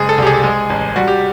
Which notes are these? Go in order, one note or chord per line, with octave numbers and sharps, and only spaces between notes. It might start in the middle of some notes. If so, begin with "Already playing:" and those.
Already playing: F#1 G#3 G#4
A4
C2 G4
G#4
G#3
A1
G3 F#4
G4